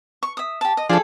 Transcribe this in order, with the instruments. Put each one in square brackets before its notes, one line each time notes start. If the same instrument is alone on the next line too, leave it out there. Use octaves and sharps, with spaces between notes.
[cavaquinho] C#6
E5 D#6
G4 A5
D#5
[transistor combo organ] F3 D4 [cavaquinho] G#4 A4